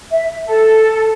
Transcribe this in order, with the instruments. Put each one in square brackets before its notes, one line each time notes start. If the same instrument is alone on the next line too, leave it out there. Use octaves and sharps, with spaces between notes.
[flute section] E5
A4